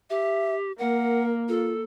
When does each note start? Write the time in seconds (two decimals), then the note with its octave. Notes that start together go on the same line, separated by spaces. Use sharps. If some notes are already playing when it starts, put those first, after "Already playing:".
0.10 G4 E5
0.79 A#3 A#4 F#5
1.49 F4 A4